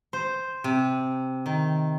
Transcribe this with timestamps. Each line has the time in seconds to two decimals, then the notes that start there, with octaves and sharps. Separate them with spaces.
0.13 C5
0.64 C3
1.46 D#3